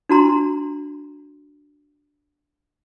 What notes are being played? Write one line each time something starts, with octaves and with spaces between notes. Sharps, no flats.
D4 F#4 A#5 C6